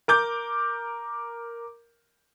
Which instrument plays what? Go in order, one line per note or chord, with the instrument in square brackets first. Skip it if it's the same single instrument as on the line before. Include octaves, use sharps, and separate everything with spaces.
[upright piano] A#4 D6 G6